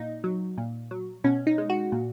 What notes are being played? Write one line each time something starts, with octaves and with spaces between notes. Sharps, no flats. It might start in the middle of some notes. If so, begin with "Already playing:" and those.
Already playing: A#2 D#4
F#3
A#2
F#3
B2 C#4
D#4
G#3
F#4
A#2